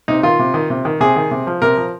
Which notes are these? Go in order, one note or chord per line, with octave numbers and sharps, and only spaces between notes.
C3 D#4
D#3 F4
C3
D#3
C3
D#3
C3 G#4
D#3
C3
F3
C3 A#4
F3